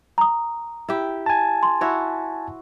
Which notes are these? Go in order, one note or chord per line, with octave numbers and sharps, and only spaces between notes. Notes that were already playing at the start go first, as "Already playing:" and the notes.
A#5 D#6
E4 G4
G#5 A5
C6
E4 F#4 C#5